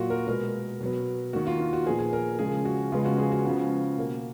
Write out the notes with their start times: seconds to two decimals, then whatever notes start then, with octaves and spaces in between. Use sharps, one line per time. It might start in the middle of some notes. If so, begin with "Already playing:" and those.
Already playing: A#2 F#3 A#3 F4 F#4
0.10 A#4
0.27 B2 G#3 B3 A#4
0.81 B2 F#3 B3
1.33 D#3 A#3 F#4
1.47 F4
1.60 F4
1.73 F#4
1.86 A#2 F3 B3 G#4
1.99 G#4
2.13 A#4
2.39 C#3 F3 G#3 G#4
2.65 F#4
2.92 C#3 F3 G#3 B3 F4
3.05 F#4
3.18 G#4
3.32 F#4
3.45 C#3 F3 G#3 B3 F#4
3.98 B2 A#3